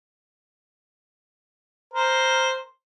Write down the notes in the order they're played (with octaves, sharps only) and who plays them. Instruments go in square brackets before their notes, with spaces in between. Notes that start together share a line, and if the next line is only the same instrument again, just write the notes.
[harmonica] A#4 C5